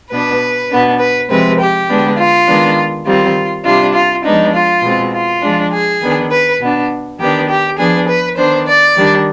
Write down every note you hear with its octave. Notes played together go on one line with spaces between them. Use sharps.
B2 B3 D4 B4
B2 B3 D4
B4
C3 F3 G#3 C4 B4
G4
D3 G#3 B3 D4
F4
D#3 G#3 B3 D4
D#3 G3 C4 F4
C3 G3 D4 F4
F4
F3 G#3 B3 D4 D#4
F4
B2 G#3 C4
F4
F3 G#3 D4
G#4
D#3 B3 D4
B4
B2 B3 D4
D#3 B3 D4 G4
G4
F3 B3 D4 G#4
B4
D#3 B3 D4 C5
D5
D#3 G3 D4